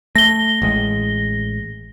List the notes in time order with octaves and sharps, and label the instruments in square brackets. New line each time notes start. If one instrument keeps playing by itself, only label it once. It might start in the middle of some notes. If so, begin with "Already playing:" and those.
[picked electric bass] A3 [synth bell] A#6 G7
[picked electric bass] A1 G#3